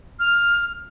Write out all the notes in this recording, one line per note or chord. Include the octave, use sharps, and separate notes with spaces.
F6